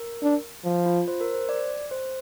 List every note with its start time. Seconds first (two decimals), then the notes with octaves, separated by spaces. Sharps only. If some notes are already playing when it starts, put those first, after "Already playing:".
Already playing: A#4
0.23 D4
0.65 F3
0.86 F4
1.08 C5
1.21 A#4
1.33 C5
1.49 D5
1.91 C5